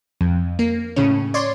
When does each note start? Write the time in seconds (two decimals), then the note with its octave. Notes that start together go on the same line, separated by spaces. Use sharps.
0.21 F2
0.59 A#3
0.96 A2 C#3 C#4
1.34 C#5 D5 C6